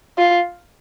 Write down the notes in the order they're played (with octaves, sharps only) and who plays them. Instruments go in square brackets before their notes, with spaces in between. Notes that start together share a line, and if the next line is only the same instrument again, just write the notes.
[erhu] F4